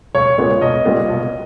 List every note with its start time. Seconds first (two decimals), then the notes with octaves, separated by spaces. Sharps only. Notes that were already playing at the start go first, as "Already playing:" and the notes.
0.14 B1 C#5
0.38 A#2 G#3 B3 C#5
0.61 B1 D#5
0.85 A#2 G3 B3
1.09 B1